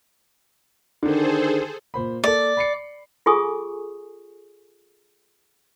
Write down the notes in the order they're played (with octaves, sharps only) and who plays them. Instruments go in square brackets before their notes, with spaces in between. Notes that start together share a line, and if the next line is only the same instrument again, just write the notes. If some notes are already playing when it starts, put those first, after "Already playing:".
[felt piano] D3 D#3 [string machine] G#4 A4 C5
[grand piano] A#2 C5 B5
[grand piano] A#3 A4 [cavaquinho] D5
[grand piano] B5 C7 C#7
[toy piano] F4 G#4 A4 G#5 C#6 D#6